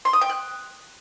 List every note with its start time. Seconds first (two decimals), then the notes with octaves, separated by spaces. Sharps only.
0.05 C6
0.13 D#6
0.21 G5
0.30 F#6